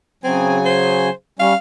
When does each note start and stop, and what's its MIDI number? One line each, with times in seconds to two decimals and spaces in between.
0.24 1.09 49
0.24 1.09 54
0.24 0.58 60
0.24 1.09 80
0.65 1.11 72
1.39 1.54 55
1.39 1.54 61
1.39 1.56 77